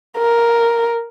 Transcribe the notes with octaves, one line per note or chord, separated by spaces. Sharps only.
A#4